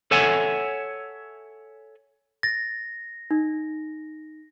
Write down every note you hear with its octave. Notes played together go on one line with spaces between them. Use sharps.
A4 C#5 E5 F#5 G#5
A6 A#6
D#4